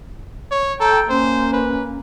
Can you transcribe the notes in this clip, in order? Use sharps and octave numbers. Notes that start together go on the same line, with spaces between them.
C#5
A4 G5 A#5
A#3 C#4 C5
B4